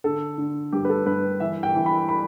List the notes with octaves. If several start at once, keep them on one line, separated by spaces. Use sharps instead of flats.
D3 A4
D3
G2 G4
B4
A4
G2 B4
E3 E5
G5
E3
B5
B5